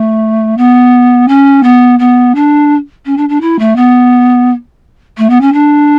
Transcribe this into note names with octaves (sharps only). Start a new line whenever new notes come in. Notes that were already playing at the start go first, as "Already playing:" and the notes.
Already playing: A3
B3
C#4
B3
B3
D4
C#4
D4
D4
E4
A3
B3
A3
B3
C#4
D4